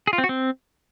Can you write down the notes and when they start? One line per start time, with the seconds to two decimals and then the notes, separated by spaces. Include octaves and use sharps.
0.07 G#4
0.13 F4
0.18 C4
0.24 F#4
0.29 C4